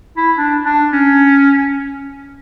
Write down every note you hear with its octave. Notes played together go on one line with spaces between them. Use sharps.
E4
D4
D4
C#4